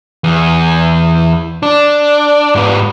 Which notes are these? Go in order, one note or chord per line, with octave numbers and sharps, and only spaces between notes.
E2
D4
G#2 B3